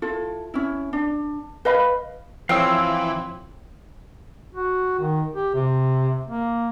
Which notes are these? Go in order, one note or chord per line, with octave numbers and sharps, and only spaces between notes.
E4 F4 A4
C#4 E4
D4
B4 D#5 F5 B5
E3 F3 C4 C#5 F5 G5 E6
F#4
D#3
G4
C3
A#3